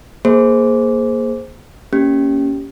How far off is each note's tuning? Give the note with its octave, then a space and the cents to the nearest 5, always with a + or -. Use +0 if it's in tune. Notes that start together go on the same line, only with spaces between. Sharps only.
A#3 +0 G#4 +10 C5 +0
A#3 -5 C#4 +5 G4 +0